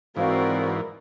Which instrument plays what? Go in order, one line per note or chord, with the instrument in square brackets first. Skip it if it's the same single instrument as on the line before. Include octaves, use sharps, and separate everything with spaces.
[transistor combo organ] G#2 E3 [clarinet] C4 [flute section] F#4 C5 F5 [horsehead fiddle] A#4 D5